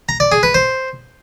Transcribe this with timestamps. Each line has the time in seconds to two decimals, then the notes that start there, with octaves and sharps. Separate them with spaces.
0.09 A#5
0.20 D5
0.32 G#4
0.43 B4
0.54 C5